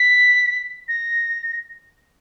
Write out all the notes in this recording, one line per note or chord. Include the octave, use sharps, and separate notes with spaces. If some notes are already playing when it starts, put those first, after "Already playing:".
Already playing: B6
A#6